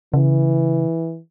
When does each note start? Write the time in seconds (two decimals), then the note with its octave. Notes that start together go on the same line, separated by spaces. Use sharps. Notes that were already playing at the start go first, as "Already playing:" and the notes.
0.14 C#3 E3